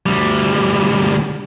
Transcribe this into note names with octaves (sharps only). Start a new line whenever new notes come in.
D2 G3